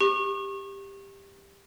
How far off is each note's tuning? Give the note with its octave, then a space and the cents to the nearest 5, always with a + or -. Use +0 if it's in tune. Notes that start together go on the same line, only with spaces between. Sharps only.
G4 +10 C#6 -30